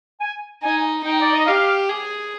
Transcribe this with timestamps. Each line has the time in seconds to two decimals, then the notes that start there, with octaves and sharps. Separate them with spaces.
0.20 G#5
0.63 D#4 G#5
1.05 D#4 G5
1.21 D5
1.34 D#5
1.46 G4 F5
1.89 G#4